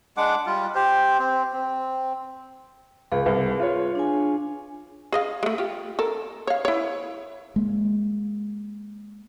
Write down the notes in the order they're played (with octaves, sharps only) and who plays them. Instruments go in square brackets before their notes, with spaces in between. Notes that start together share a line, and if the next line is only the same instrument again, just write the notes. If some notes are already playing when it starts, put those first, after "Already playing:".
[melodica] G#3 D4 F#5 D6
G3 F4
G4 C5
C4
C4
[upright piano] C#2 [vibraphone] G#4 B4
[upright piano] C2
F4 C#5
[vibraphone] D4 G#4 G#5
[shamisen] G#4 D#5 F5
G#3 A3
F4 G4
A4 A#4
C#5 F5
E4 C#5
[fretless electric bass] G#3 A#3